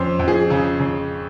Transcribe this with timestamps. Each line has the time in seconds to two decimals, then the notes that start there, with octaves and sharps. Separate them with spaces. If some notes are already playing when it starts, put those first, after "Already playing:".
Already playing: F2 C#4 C5
0.19 F2
0.28 G#4
0.50 C#3
0.80 C#3